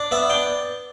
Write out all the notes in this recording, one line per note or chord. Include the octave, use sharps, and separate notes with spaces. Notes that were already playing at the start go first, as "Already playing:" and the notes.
Already playing: D4
B3 E5
D4 G5